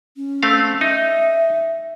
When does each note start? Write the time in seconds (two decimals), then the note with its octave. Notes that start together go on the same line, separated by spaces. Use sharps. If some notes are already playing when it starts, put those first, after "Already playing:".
0.16 C#4
0.43 A3 C4 F5
0.81 D#4 E5